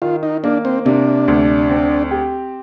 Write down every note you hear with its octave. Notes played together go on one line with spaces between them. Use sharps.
D#3 F4
D#4
A#3 D4
C4
C3 D4
D2
C4
G4